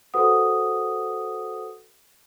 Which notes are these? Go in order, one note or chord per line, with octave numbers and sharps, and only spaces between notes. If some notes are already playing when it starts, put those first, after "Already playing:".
F#4 A4 B4 C5 F#5 D#6